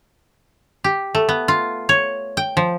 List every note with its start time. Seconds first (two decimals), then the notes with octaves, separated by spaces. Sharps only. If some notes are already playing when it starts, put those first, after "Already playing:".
0.84 G4
1.15 A3
1.29 B3
1.48 F4
1.89 C#5
2.37 G5
2.57 F3